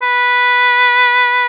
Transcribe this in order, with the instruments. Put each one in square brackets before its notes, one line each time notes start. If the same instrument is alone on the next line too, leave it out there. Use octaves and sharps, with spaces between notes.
[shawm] B4